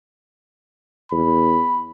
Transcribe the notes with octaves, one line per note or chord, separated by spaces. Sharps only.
E2 B5